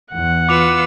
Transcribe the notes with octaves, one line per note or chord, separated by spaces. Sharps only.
E2 F#5
F4 B4 D6 E6 C#7 F7